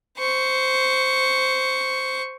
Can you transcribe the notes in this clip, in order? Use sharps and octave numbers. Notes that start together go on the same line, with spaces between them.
C5 C#6